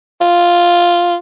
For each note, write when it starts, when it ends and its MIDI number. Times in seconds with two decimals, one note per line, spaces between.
0.21 1.15 65